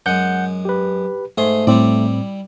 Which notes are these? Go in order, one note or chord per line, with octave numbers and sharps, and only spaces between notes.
F#2 G#3 F#5 G6
G4 B4
G#2 A3 G#4 C6
A2 G3 C4 E4 D5